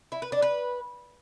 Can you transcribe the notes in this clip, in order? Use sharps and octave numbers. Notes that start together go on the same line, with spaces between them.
E4
B4
D4
B4